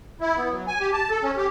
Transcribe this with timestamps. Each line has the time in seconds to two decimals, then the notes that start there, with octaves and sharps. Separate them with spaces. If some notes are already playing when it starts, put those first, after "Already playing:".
0.21 E4
0.37 B3
0.51 F#3
0.67 G#5
0.80 G4
0.93 A5
1.10 A4
1.23 C#4
1.37 G4